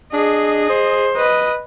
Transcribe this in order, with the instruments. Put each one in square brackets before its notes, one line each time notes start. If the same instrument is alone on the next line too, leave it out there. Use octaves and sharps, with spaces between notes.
[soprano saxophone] D4 [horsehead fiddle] G#4 D#5
[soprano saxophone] C5
[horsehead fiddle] B4 D#5